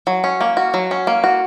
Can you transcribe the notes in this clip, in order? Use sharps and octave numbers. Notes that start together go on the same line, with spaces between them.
F#3
C#4
A#3
F#4
F#3
C#4
A#3
F#4